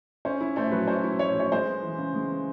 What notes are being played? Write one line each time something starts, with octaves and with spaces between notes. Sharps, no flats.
C#4 C5
E4
A3 C5
F#3 B4
C#4 C5
E4
A3 C#5
F#3 C#5
G#3 C5
B3
E3
C#3
G#3
B3